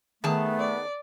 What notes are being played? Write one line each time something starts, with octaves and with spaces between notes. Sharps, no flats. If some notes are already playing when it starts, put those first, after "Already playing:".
D#3 A3 B3 G#4 A5
D5